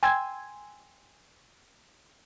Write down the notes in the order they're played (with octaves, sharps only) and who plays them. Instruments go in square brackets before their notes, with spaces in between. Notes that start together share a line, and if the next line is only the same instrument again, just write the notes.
[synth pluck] G5 G#5 C6 E6 G#6